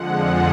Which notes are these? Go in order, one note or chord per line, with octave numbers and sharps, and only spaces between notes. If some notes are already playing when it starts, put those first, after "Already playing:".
Already playing: F2 D3 F3 G#3 F#5
F#5